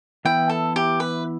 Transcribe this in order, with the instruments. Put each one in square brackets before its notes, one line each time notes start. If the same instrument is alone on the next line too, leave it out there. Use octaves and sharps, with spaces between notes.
[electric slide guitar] E3 B3 E4 [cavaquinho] G5
[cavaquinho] A4
G4
B4